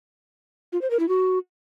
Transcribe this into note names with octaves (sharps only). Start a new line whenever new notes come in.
F4
C5
A#4
E4
F#4